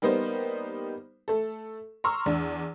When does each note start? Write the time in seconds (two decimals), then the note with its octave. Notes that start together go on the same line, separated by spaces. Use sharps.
0.02 G3 A#3 B3 D#4 C5
1.28 A3 A4
2.04 A#5 C6 C#6 E6 F6
2.26 E2 D4